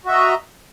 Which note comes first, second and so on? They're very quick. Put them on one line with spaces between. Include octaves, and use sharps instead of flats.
F#4 E5 D#5 A#5